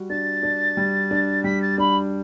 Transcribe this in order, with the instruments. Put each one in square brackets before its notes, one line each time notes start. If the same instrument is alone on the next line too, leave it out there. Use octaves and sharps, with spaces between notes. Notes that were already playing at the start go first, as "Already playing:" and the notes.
Already playing: [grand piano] G3 F#4
[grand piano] D4 [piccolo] A6
[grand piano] D4
G3
D4
[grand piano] G3 [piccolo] B6
[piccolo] A6
[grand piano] D4 [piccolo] B5